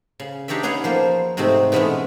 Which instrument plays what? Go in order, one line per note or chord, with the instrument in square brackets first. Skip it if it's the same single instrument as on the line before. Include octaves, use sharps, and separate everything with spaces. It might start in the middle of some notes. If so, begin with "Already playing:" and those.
[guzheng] C#3
D4 D#4 G4 C#5 D5 E5
B3 C#4 G#4 C#5 F#5 G#5
F3 A#3 C5
G#2 C3 A3 C4 D#4
B2 E3 G#3 A3 B3 C#4